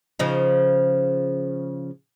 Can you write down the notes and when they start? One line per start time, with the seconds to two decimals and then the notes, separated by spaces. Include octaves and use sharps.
0.19 C#3 F3 D#4